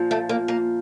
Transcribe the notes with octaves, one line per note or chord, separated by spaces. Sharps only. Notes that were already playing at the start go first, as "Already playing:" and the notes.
Already playing: A#2 F3
A3
A#3
A#3